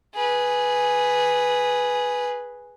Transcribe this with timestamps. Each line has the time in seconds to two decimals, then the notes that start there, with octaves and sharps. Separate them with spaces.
0.15 G#4 B4